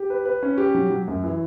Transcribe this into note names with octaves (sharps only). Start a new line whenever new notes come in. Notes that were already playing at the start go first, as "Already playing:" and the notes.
Already playing: G4
B4
B4
C#4
G4
F#3
F#3
F#2
E3